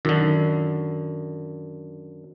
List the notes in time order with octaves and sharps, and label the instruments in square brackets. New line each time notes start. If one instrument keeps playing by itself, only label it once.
[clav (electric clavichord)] F#2 D3 [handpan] D#3